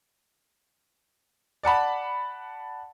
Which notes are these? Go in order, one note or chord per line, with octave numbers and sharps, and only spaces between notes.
D5 F#5 A5 B5